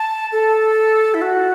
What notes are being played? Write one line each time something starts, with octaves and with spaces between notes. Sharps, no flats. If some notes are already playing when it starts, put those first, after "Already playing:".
Already playing: A5
A4
E4
F#4